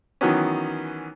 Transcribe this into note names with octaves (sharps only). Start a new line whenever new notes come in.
D#3 E3 F#3 B3 C#4